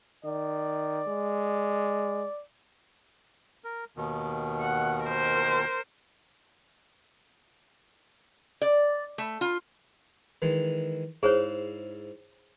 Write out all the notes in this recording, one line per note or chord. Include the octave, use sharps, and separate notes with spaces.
D#3 D5
G#3
A#4
D#2 B2 D#3
F#5
A#4 C5
D5
A3
F4
D#3 E3 G#3
G#2 E4 G#4 C5 C#5 F5